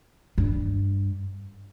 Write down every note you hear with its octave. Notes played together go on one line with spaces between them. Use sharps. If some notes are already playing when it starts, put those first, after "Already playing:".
G2